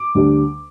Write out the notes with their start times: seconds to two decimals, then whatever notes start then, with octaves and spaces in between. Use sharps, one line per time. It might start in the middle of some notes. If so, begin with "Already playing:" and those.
Already playing: D6
0.15 D2 D3 G3 D4